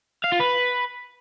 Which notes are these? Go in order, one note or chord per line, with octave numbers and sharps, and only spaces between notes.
F5
F4
B4